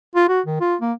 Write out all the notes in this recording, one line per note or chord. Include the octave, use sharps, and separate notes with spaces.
F4
F#4
D#3
F4
A#3